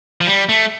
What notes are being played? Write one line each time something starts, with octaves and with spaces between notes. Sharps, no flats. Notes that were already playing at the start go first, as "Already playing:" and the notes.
F3
G3
A3